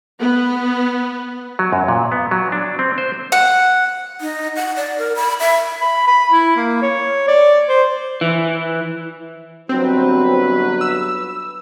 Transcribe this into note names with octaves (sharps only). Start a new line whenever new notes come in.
B3
F#3
F#2
A#2
B3
F#3
D4
C4
C5
F#5
D#4
F#5
D5
A#4
B5
E5
B5
B5
E4
A#3
C#5
D5
C5
E3
G1 F#3 C4 B4
E6